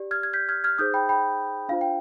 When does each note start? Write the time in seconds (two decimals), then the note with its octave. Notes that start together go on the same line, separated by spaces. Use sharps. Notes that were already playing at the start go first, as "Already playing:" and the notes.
Already playing: G4 D5
0.11 F6 G#6
0.23 G#6
0.33 G6 B6
0.49 F6 G#6
0.64 F6 G#6
0.78 D#4 G#4 C5 D#6 G6
0.94 G5 B5
1.09 G5 B5
1.69 D4 F4 C5 F5
1.81 G5